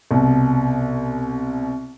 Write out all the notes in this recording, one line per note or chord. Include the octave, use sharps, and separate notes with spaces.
C2 B2